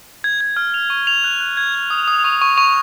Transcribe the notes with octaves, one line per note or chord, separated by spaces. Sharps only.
G#6
G#6
F6
F7
C#6
F7
F#6
F#6
G#6
G#6
D#6
D#6
C#6
C#6
C#6